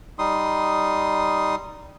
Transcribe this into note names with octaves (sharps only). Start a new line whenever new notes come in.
G3 D#4 C6 D#6